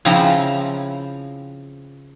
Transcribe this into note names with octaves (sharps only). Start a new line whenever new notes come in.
C#3 F3 C4 E4 C5 A#5